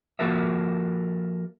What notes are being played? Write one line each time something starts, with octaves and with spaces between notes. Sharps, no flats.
F3 A#3 F#4 A4 A#4 E5